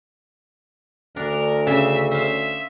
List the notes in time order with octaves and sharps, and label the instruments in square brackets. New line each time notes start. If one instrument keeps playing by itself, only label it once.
[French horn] D2 [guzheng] D4 [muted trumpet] A#4
[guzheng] C#3 [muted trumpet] E5
[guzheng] C5 F5 [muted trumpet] E5